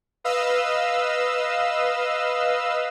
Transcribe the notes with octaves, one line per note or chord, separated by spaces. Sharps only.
B4 D#5 F5 E6